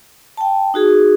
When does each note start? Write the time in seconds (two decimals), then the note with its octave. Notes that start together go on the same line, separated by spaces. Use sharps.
0.37 G5 A5
0.74 D#4 F#4 G#4